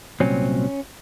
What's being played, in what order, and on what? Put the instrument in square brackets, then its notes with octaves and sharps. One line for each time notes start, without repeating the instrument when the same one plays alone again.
[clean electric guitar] C2 A#2 F#3 C4 C#4